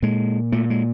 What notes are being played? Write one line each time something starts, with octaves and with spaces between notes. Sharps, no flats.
A#2 G#3
A#2 A3
G#3